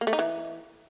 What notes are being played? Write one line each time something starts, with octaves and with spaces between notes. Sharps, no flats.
A#3
A3
D#4
E3